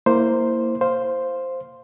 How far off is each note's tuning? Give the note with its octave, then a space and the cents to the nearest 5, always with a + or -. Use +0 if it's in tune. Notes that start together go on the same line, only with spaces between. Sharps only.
A#3 -10 E4 -5 C5 +0
C5 +0 F5 +0